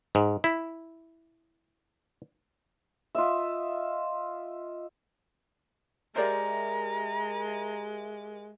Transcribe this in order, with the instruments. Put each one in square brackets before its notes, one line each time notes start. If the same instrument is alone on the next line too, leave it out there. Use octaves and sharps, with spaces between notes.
[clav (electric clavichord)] G#2
E4
[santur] F4 D#5 E5
[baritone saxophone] G#3 [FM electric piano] G4 A#4 E5 [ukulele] C5 D5 [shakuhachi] A#5